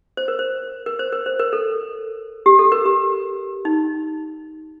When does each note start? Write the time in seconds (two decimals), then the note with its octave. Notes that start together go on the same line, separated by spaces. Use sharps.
0.17 C5
0.28 A#4
0.39 C5
0.86 A#4
0.99 C5
1.12 A#4
1.26 C5
1.39 A#4
1.53 A4
2.46 G4
2.59 A4
2.72 A#4
2.86 G4
3.65 D#4